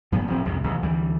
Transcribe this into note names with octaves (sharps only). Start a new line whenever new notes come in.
G2 A#2 F3 B3
F#1 A2 F3 C4
C2 F2 G#2 C3
A#1 D#2 C3 E3
D2 E3 G3